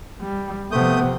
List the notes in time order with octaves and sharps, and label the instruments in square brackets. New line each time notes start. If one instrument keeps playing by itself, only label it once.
[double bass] G3
[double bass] C3 F3 [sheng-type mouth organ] A3 D#6 G6 [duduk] B3